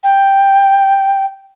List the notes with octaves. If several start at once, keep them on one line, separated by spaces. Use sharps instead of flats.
G5